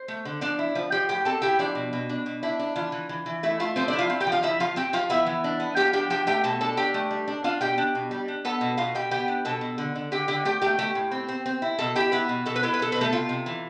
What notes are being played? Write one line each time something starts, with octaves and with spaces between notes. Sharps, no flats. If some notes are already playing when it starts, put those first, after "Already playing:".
Already playing: C5
A3
D3
F3 D4 D5
E4
F3
F3 G4 G5
A2 G4 G5
C4 A4 A5
E4 G4 G5
F3 D4 D5
B2
B2
D4
B2
D4 E4
D4
E3 F4
E3
E3
E3
A3 E4
A3 F4
F3 C4 C5
D4 E4 D5
F4 F5
C4
G4 G5
F3
F4 F5
F3 E4 E5
F3 F4 F5
C4 G4 G5
F3 F4 F5
B3 E4 E5
E3
D4
B3
F3 G4 G5
D4 G4 G5
F3 G4 G5
A3 G4 G5
B2 A4 A5
D4 A4 A5
D4 G4 G5
A3
G3
D4
D4 F4 F5
B2 G4 G5
D4
B2
G3
D4
B3 A4 A5
B2
B2 F4 F5
B2 G4 G5
B3 G4 G5
D4
B2 A4 A5
B2
D3
D3
D3 G4 G5
D3 G4 G5
A3 G4 G5
A3 G4 G5
A3 G4 G5
A2
C4
C4
C4
E4
B2 A4 A5
E4 G4 G5
B3 E4 B4
B2
B2 A4
B4
E4 A4
B4
B2 A4
B4
B2 A3 A4
C3 F4
C3
E3